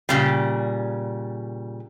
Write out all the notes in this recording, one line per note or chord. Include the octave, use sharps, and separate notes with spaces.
A#2 C#3 G3